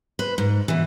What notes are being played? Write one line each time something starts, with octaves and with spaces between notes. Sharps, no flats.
B4 C5
G#2
B2 E3